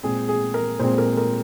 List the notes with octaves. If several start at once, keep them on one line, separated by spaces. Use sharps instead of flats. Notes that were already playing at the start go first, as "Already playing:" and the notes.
A#2 G#3 C4 G#4
G#4
A#4
A#2 G#3 C4 C5
A#4
A#4